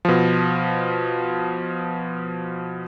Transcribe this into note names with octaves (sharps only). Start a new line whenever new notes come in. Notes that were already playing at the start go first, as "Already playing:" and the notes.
B2 F3